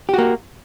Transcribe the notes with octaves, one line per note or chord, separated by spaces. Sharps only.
A#3 F#4 G4